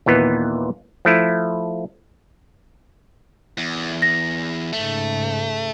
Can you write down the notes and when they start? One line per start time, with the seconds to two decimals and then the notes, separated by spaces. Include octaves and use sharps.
0.06 D#2 A#2 E3 B3
1.05 F3 A3 E4
3.58 E2
4.02 A#6
4.73 G#2 C#3 A3